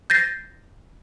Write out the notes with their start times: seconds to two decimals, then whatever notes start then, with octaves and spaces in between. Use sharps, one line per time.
0.10 G6 A6 A#6 C7